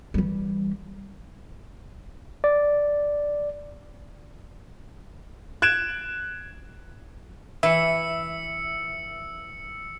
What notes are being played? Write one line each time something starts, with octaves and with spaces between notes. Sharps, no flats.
E3 G3
D5
F#6 G#6 D7 E7
E3 E5 E6 C#7